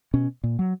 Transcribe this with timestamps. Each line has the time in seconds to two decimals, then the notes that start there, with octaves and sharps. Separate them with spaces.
0.14 B2 C#4
0.44 A#2
0.59 F#3